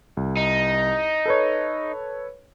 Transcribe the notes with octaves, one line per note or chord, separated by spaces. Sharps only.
C2
D#4
A4 B4 C#5